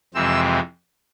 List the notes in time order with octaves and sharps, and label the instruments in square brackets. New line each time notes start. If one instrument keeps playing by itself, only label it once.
[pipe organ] F2 C3 E3 G#3 C4 E6